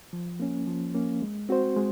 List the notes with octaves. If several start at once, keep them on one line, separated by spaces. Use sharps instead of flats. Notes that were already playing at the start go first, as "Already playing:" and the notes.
F3
A#3 C#4
F3
A#3 C#4
G#3
C4 F#4 C5
G#3